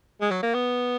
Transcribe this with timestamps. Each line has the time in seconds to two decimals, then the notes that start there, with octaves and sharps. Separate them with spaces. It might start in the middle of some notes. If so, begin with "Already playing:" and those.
0.21 G#3
0.31 F#3
0.43 A#3
0.54 B3